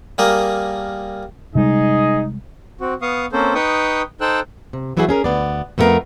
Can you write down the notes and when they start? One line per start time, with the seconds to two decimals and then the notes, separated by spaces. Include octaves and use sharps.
0.18 G3 A#3 G#4 A#4
1.55 C3 G3 G#3 D#4 G#4 D#5
2.81 C4 F#4
3.02 B3 F5 C#6 D#6
3.32 A#3 C4 C#4 A4 C5
3.55 D#4 B4 G5 C#6 D#6
4.21 D#4 A4 C5 G5 E6 F#6
4.73 C3
4.97 E3 F#3 B3 E4 F#4 G#4
5.09 C#4 G#4 A#4
5.24 D2 G#2 B3 D5
5.78 F2 A3 B3 E4 A#4 F5